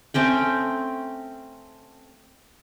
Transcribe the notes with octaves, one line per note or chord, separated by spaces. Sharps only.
A3 C4 C#4 G5